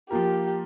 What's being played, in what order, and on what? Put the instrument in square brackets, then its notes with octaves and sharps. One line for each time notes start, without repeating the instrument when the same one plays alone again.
[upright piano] F3 A#3 F4 A#4 [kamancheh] G4